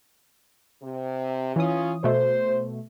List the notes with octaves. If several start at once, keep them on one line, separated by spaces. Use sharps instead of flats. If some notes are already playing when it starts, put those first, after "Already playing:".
C3
E3 C#4 F4 D#6
B2 A3 C5